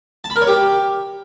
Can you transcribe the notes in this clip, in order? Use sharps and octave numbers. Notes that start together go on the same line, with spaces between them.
A5
B5
A#4
C#5
G4